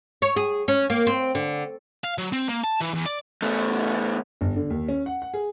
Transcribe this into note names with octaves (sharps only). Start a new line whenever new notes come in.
C#5
G#4
C#4
A#3
C4
D3
F5
F#3
C4
A#3
A5
E3
E2
D5
E2 A3
G1
D3
D#2
C#4
F#5
F#5
G#4